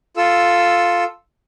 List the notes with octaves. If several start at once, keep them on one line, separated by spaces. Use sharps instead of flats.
F4 A4 E6